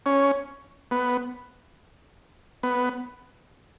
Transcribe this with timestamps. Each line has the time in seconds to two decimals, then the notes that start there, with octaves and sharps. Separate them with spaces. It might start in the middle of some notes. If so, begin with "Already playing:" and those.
0.06 C#4
0.91 B3
2.63 B3